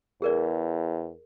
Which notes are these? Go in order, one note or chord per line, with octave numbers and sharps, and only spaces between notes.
E2 G#4 A#4 D5